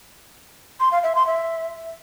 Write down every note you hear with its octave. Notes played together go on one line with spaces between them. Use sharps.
C6
F5
E5
C6
E5